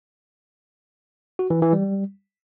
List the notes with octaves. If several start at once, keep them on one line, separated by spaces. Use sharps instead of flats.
F#4
E3
E3
G3